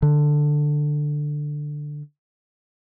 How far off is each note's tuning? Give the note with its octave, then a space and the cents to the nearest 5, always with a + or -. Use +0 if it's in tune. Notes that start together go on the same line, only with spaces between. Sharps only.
D3 +10